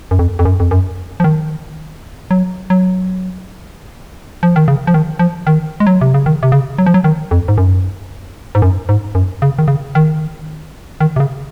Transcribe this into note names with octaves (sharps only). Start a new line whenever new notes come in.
F#2
F2
F2
F#2
F2
F#2
F3
D#3
F#3
F#3
F3
D#3
C#3
F3
D#3
F3
D#3
G#3
F#3
C3
C#3
D#3
C3
C#3
F#3
F3
F#3
D#3
F2
G#2
F#2
G#2
F#2
G#2
F#2
C#3
D#3
C#3
D#3
D#3
C3
C#3